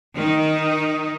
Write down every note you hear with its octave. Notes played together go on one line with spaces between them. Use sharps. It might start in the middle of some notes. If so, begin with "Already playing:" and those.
D#3 D#4